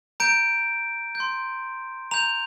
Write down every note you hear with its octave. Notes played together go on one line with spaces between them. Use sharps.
A#5 G6 D7
G6
C6
A#5 G6 F7